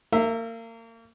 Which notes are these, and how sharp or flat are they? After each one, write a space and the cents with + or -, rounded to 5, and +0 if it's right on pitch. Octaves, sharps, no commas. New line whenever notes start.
A#3 -35 A#4 -30 E5 +0